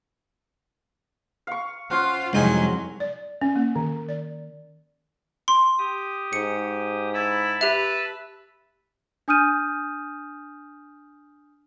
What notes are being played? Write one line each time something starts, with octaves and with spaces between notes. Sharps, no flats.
F5 C#6
C#4 F4 C5 F#5
C2 F2 F#3 G#3 D#4 G#5
D5
C#4
A#3
D#3
D5
C6
G4 D#6
G#2 C#7
E4 A5 B5 E6
G4 B4 E5
D4 G#5 D#6 F6 G6 D#7